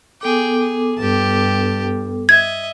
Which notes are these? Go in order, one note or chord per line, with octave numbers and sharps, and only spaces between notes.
B3 G#4 A4 G5 D6
G#4
G2 G4 A5
D#5 E5 G#6